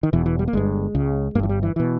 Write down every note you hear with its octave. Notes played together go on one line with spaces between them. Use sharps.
D#3
E1 E2 B2 E3
E3
G3
A#3
G1 G2 G#3
C#2 C#3
G1 G2 E3 A#3
G3
E3
B2 E3